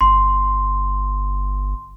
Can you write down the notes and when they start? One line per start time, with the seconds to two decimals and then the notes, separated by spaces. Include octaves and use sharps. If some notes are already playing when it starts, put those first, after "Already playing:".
0.01 G1 C6